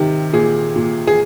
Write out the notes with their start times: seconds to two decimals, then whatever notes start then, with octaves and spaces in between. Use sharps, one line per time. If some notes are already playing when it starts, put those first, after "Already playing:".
Already playing: C3 D#3 G4
0.33 A#2 G#4
0.76 A#2
1.07 G#4